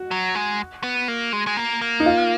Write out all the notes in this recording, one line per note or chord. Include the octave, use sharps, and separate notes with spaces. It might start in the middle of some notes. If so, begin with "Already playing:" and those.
Already playing: F#4
F#3
G#3
B3
A#3
G#3
G#3
A#3
A#3
D#4
F4